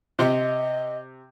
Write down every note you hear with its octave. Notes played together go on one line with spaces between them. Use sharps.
C3 D#5